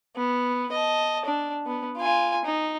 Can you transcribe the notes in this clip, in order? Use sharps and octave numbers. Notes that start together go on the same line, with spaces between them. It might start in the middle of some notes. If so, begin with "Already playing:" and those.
B3
D#5 A5
D4
B3
F4 G#5
D#4